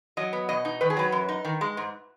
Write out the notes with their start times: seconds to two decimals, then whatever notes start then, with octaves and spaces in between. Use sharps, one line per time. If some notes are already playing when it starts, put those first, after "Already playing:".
0.17 F#3 D#5
0.33 B3
0.49 B2 D#5
0.65 D#4
0.81 D#3 B4
0.90 G#4
0.97 F#3 B4
1.12 F#2
1.29 D#4
1.45 D#3
1.61 G#3
1.77 G#2